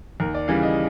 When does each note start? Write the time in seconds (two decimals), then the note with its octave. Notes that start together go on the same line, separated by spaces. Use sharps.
0.20 D#2 A#4
0.34 D5
0.48 C#3 E3 G3 F5
0.63 D#5